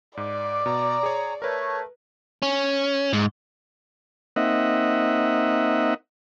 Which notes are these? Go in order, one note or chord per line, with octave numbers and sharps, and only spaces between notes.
G#2 D5 D6
B2 A#5
G#4 C#5
A3 A#4 B4 C#5
C#4
G#2
A#3 C4 D#4 D#5 E5 F#5